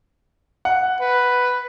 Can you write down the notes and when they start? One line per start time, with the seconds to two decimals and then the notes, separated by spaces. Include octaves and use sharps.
0.65 F#5
1.01 B4